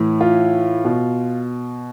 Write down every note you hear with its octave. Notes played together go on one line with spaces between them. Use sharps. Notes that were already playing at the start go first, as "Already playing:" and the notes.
Already playing: A2 E3
F4
B2